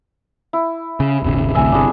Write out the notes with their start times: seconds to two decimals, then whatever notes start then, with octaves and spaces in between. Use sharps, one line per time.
0.53 E4
1.00 C#3
1.22 D#1 G#1 C#3
1.55 A1 D2 C3 E5 G#5
1.72 G1 C3 D4 E4 G#4